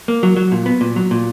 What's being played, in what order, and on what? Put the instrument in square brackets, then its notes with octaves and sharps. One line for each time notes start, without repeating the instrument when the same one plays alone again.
[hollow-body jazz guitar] A#3
F#3
F#3
A#2
B3
A#2
F#3
A#2